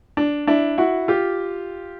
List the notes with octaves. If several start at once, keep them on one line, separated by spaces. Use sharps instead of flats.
D4
D4 E4
E4 F#4
F4 G4